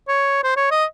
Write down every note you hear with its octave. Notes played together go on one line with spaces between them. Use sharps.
C#5
C5
C#5
D#5